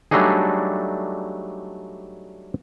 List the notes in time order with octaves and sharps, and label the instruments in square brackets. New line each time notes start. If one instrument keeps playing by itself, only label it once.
[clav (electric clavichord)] F#3 G3 A3 D4 D#4 G#4